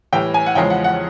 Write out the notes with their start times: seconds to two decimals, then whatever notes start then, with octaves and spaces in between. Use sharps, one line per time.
0.13 A2 E3 G3 G5
0.34 G#5
0.46 F#5
0.55 E2 C#3 F3 G#3 C#4 G5
0.70 F#5
0.84 F#5